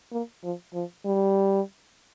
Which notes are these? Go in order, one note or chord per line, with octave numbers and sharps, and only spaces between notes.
A#3
F3
F3
G3